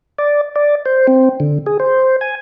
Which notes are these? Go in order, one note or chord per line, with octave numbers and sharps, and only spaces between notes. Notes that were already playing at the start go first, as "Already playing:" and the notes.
D5
D5
C5
C4
D3
G#4
C5
G#5